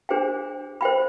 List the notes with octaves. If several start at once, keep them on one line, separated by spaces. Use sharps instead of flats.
D4 G#4 C5 G5
C5 G5 B5